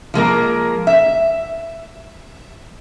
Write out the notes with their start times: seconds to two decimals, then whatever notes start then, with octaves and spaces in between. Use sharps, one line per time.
0.14 F3 G#3 A#3 A#4
0.87 E5